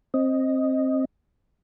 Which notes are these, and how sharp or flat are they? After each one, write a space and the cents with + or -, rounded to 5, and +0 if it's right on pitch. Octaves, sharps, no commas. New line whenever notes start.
C4 +20 D#5 +0